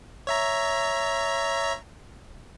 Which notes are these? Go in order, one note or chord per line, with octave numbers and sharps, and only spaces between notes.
C#5 E5 A#5